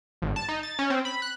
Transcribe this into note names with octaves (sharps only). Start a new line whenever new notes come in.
G#1
A5
D#4
A6
C#4
C4
B5
F#6